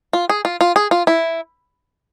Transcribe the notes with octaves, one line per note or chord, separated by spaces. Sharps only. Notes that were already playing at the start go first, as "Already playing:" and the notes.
F4
G#4
F4
F4
G#4
F4
E4